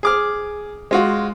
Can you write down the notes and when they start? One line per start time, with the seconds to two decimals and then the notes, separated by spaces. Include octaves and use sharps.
0.03 G#4 D6 F6
0.91 G#3 F4 F#4